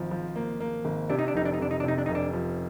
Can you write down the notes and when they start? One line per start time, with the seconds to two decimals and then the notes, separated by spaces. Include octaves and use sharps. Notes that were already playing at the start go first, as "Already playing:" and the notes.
Already playing: G#1 F3
0.11 F3
0.36 A#3
0.60 A#3
0.85 G#1
1.10 C3 D4
1.19 D#4
1.28 D4
1.35 F1 D#4
1.45 D4
1.53 D#4
1.59 F1 D4
1.71 D#4
1.80 D4
1.84 C3 D#4
1.98 D4
2.06 F1 D#4
2.15 D4
2.33 F3